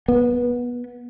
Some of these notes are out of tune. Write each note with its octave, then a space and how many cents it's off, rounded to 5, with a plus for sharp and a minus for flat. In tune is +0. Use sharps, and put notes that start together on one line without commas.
B3 -20